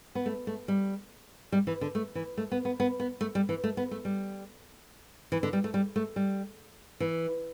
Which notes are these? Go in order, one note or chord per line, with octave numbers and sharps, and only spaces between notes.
B3
A3
A3
G3
G3
E3
D3
A3
E3
A3
B3
B3
B3
B3
A3
G3
E3
A3
B3
A3
G3
E3
D3
G3
A3
G3
A3
G3
E3